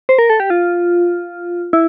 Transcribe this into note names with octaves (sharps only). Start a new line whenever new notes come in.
C5
A#4
A4
G4
F4
E4